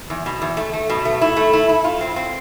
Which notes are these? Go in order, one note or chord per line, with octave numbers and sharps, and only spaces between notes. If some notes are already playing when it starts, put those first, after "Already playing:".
E2
B2
E2
A3
A3
B2
A3
E4
A3
E4
E4
F4
C4
C4